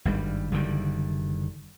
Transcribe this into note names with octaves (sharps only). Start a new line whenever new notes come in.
G#1 G2 G3
F#1 D3 D#3 G3